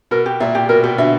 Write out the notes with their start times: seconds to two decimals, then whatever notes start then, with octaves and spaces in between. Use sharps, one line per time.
0.11 B2 A#4
0.26 G4
0.40 A#2 E5
0.55 G4
0.69 B2 A#4
0.84 B2 G4
0.98 B2 D3 E5